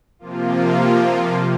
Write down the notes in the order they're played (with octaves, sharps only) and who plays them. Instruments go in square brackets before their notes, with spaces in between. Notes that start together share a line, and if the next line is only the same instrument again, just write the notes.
[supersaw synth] C3 F3 A#3 F4